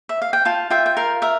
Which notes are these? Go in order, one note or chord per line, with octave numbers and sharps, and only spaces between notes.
E5
F5
G5
F4 F5 A5
F4 E5 G5
G5
A#4 F5
A#4 E5